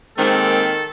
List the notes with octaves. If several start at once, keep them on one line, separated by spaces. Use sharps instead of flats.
D#3 G#3 A#3 C4 A4